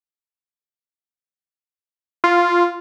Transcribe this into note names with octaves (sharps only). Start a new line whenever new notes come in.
F4